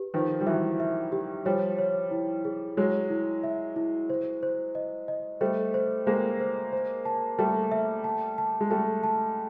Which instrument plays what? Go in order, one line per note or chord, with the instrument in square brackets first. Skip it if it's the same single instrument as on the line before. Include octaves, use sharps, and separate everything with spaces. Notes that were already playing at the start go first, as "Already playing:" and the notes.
Already playing: [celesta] G4 B4
[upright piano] D#3 F3 [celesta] B4
[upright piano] G3
[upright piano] E3 F#3 [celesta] E5
[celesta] E5
G4
[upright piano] F3 G3 [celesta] C#5
[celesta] C#5
E4
G#4
[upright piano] F#3 G#3 [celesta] C#5
[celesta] E4
E5
E4
C5
C5
D#5
D#5
[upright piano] G3 A3 [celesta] C5
[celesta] C5
[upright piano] G#3 A#3 [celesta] C5
[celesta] C5
C5
A5
[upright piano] G3 A3 [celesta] A5
[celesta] E5
A5
A5
[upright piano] G#3
[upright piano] G3 A3 [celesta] A5
[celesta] A5